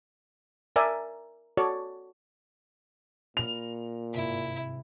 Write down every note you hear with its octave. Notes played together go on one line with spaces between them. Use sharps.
A#4 D5 E5 G#5 A5
F#4 A4 C#5 D5
A#2 B5 F6 F7
G#1 G2 C3 E4